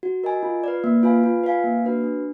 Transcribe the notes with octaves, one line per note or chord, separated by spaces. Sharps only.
F#4
A#4 D#5 G#5
F4
B4 D5
A#3
F4 B4 F5 G#5
F4
B4 F5 G#5
A#3
D4 F#4 B4
D4